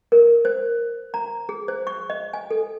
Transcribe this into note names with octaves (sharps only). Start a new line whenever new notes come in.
A#4
C5
A#5
G#4
C5
C#6
D#5
G#5
A4